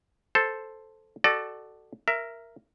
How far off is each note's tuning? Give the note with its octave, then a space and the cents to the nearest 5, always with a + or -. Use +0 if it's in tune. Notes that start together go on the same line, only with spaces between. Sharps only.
A4 +0 C5 +0
F#4 +25 A4 +0 D5 +30
A#4 +0 E5 +20